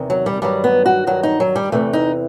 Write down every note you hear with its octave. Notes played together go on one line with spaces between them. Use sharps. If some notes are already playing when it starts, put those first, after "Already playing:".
Already playing: E2 C3 D#3
F#3
G3
G2 D#3 F#3 G3
B3
F#4
G2 D#3 F#3 F#4
D#4
F#3
G3
E2 C3 E3 A3
D#4